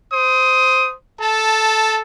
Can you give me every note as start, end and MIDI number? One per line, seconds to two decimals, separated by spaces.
0.10 0.93 72
0.10 0.93 87
1.19 2.00 69
1.19 2.00 81